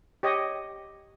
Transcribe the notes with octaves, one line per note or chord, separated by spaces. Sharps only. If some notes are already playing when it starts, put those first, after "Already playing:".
G4 C#5 D#5